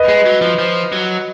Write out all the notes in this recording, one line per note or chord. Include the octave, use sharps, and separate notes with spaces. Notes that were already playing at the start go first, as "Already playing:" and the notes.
Already playing: B4 D#5
G#3
F#3
F3
F3
F#3